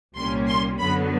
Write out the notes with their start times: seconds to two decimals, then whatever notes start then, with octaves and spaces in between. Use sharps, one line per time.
0.16 C2 A#2 G3 A#3 C#4 C6
0.48 C6
0.79 F#2 D3 F#3 B3 B5